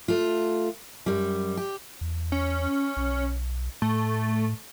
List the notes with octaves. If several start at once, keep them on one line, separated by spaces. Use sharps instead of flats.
A3 F4
F#2 G3
G4
E2
C#4
B1
A2 A3